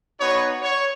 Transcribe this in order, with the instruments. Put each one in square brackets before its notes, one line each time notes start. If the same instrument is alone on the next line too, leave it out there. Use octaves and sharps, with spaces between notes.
[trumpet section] B3 D#4 F#4 C#5
C#5